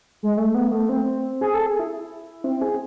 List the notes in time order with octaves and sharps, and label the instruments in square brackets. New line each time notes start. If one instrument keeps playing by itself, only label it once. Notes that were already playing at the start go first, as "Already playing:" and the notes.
[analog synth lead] G#3
A3
B3
A3
C4
G#4
A4
G#4
E4
C4
G#4